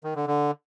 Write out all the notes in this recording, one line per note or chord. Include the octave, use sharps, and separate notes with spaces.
D#3
D3
D3